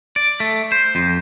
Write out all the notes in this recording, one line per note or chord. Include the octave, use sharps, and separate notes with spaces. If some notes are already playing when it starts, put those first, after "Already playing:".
D5
A3
C5
F2